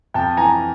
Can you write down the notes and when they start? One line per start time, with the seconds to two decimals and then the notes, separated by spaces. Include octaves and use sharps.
0.14 F2 G5 A5
0.37 E3 G#5 A#5